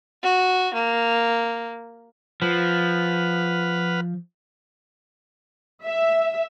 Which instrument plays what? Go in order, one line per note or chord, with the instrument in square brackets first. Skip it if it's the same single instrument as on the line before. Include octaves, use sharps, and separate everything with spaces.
[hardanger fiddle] F#4
A#3
[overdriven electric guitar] F3 [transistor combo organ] B4 F#5 F6
[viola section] E5